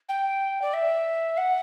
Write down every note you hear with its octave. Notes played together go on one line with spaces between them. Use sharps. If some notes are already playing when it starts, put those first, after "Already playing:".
G5
D5
E5
F#5